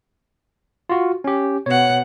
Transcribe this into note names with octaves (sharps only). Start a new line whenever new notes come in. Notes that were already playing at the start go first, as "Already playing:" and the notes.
F4 F#4
C#4 G4
B2 C#5 F#5